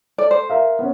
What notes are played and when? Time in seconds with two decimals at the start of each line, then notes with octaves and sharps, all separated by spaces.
0.18 A4 D5
0.31 C5
0.50 A#4 E5 F5
0.79 B3 C#4